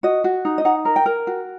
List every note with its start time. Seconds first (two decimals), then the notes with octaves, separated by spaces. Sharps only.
0.03 F#4 D#5
0.24 F#4
0.45 D#4
0.58 D#5
0.65 D#4 F#5
0.85 A#4
0.96 G5
1.06 A#4
1.27 F#4